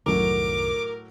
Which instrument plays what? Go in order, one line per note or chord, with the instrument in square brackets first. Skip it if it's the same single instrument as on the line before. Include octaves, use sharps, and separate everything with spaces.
[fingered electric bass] C2 F#2 D#3 [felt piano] A2 F#3 [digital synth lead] A#4 [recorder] D6